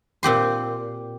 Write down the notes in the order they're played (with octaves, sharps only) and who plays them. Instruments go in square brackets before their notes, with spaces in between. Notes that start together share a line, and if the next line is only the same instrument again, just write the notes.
[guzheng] A#2 C4 G4 C6